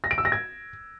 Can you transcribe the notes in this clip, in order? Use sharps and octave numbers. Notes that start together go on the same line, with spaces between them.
A#6
D7
E6
A#6
G#6